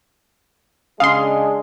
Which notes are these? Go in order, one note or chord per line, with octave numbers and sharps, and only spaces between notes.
C#3 G#3 D4 F5 C6 D#6